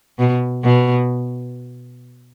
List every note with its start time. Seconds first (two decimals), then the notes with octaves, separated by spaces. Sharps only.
0.19 B2
0.64 B2